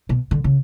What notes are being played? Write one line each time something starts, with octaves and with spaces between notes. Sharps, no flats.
B2
D3
C#3